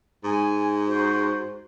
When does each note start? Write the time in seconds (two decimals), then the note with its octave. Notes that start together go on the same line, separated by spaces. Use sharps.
0.24 G#2 G#5
0.85 F#4 C5